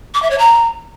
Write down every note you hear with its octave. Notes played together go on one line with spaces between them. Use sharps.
D6
E5
C#5
A#5